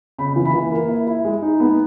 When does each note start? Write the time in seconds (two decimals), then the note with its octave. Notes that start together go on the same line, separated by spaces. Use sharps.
0.18 C#3 B5
0.36 E3
0.45 B5
0.54 E3
0.72 A#3
0.89 E4
1.07 E4
1.25 G#3
1.42 D#4
1.60 B3